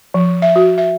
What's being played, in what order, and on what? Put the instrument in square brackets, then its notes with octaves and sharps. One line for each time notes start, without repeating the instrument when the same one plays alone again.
[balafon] F3
E5
F#4
E5